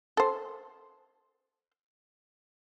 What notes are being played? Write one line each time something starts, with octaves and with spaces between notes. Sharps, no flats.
A4 C5